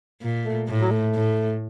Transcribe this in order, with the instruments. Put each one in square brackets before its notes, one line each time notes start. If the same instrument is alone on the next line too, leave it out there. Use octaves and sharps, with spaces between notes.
[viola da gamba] A#2
[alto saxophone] A3
[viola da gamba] A2
[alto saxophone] F#3
A3
[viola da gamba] A2